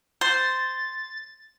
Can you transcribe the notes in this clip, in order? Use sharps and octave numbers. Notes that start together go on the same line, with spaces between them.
C5 A6